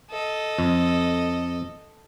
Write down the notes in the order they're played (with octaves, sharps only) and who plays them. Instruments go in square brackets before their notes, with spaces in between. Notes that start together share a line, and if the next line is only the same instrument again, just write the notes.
[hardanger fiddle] A4 D#5
[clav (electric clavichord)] F2